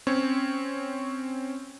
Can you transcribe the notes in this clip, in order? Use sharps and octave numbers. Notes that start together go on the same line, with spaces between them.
C4 C#4 C#5